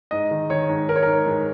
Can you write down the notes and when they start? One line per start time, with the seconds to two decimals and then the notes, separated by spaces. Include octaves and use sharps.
0.11 G#2 D#5
0.31 D#3
0.50 D#3 C#5
0.69 G#2
0.89 G#2 A#4
0.96 C#5
1.03 G#2 A#4
1.26 G#2